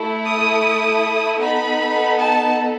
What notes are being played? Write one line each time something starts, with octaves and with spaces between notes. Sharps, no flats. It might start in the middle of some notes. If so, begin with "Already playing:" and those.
Already playing: A3 E4 A4
D#6
B3 D#4 A4 B5
A5